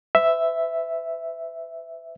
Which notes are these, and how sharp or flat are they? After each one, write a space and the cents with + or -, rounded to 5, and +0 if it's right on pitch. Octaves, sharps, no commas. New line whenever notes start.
B4 +45 E5 +0